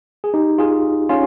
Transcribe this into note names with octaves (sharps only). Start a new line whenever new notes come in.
G#4
D#4 G4
F4 G#4
C#4 F4